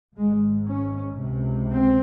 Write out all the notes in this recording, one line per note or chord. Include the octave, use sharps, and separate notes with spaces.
G#1 G#2 G#3
C#4
C#2 C3
C4